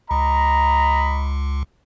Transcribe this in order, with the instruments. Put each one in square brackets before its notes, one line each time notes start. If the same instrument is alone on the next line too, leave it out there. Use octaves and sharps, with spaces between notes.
[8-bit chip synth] C#2 [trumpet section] D#5 A#5 B5